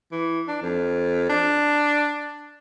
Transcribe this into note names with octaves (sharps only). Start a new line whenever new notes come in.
E3
D4
F2
D4